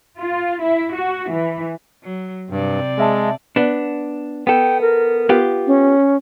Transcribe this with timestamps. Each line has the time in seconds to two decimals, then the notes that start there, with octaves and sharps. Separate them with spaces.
0.17 F4
0.61 E4
0.95 F#4
1.31 E3
2.03 F#3
2.50 G2 C3 C4 D5
2.98 G#3 G#4 E5 A5
3.56 B3 D4
4.47 B3 A4 G5
4.81 A#4
5.29 B3 F4 G4
5.67 C#4